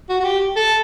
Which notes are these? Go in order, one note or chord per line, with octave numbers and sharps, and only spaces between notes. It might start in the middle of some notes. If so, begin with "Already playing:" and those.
F#4
F#4
G4
A4